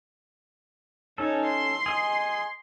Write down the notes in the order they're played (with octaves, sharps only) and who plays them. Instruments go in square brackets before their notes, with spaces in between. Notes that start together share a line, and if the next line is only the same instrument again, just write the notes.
[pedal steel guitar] C#4 A4 [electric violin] D#4 C#5
[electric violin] C6
[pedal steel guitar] G#4 D#5 G#5